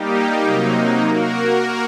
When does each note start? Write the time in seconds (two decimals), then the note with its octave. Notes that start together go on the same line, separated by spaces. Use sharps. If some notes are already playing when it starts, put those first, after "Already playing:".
Already playing: G3 A#3 D#4 G4
0.45 C3 F#3 A#3 D#4
1.04 A#3 F#4 A#4